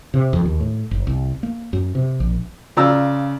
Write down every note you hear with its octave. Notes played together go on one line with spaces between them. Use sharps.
C3
F2
D#2
A2
F#1
C2
A#3
F#2
C3
A#1
C#3 F4 D5 A#5 E6